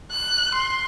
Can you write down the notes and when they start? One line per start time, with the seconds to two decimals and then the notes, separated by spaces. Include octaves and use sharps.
0.11 F#6
0.54 C6